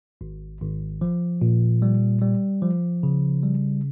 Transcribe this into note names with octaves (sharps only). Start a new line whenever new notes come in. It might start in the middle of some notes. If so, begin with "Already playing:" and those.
G#1
G#1
F3
A#2
G3
G3
F3
C#3
G3